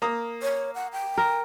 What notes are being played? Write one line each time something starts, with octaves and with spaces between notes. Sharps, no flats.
A#3 A#5 D#6
C#5
F#5
G5
A#4